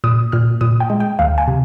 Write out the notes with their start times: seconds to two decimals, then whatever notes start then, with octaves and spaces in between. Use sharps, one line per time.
0.04 A#2 D#6
0.32 A#2 F6
0.61 A#2 D#6
0.80 G5
0.90 G#3
1.00 G5
1.19 D2 F5
1.38 G#5
1.48 C3